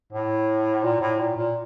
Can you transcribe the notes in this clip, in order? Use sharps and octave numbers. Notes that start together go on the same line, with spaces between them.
A2
A#2
A2
A#2
A#2